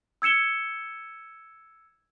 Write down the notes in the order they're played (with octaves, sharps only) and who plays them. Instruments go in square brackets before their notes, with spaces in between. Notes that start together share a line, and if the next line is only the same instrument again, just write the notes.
[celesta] E6 G#6 C#7 E7 G7